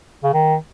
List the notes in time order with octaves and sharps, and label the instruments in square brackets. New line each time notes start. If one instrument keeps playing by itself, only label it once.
[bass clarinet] C#3
D#3